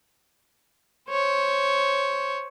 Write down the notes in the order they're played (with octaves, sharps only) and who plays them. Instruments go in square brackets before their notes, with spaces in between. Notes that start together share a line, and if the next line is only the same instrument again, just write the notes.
[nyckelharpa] C5 C#5